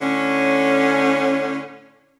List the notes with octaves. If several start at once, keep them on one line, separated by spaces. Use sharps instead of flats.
A2 D3 C#4